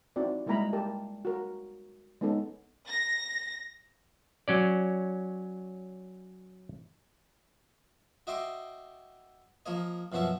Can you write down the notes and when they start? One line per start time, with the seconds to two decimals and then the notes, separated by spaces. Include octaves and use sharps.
0.16 C4 D#4 E4 F#4 D5
0.46 G3 G#3 A#3 E4 A#5 B5
0.73 G4 A#4 A5
1.25 F#4 A#4
2.21 G#3 B3 C#4 D#4 A4
2.88 A#6
4.48 F#3 C#4 D5
8.27 F#4 D#5 E5 G5 C6 D6
9.66 F3 A#3 C#5 D#5
10.12 F#2 B2 F3 F#4 E5 C#6